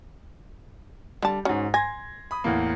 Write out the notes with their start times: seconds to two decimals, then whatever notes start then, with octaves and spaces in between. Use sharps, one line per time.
1.22 D3 G3 A5
1.45 G#2 C#4 D#4 F#4
1.74 G#5 C6 G#6 A#6
2.31 B5 D#6
2.44 E2 A2 A#3